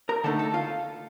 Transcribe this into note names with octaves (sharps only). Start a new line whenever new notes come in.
A#4 A#5
D3 A3 D#4 A4 A5
A4 A5
F4 F5